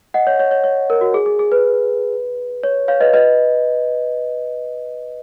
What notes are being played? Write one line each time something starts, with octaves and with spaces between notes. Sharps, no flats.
D#5 F#5
C#5
C#5
C#5
C#5
A#4
F#4
G#4
G#4
G#4
B4
C#5
C#5 F5
B4 D#5
B4 D#5